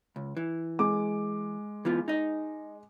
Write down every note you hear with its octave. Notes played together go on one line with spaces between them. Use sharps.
C#2
E3
G#3 D6
E3 B3 F4
D#4 D#5